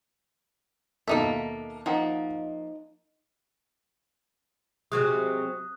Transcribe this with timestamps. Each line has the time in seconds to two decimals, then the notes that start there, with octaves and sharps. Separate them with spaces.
1.08 D#2 B2 A#3 D#4 F4 A4 E5
1.86 F3 A#3 D#4 D#5 F#5
4.92 C3 F#3 G#3 D#6 F#6